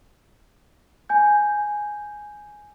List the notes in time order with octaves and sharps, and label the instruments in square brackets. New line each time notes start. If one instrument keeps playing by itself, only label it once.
[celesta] G#5 G6